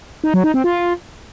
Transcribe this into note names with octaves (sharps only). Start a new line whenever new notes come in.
D#4
F#3
D#4
C4
F4